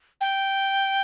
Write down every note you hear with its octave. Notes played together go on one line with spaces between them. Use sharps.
G5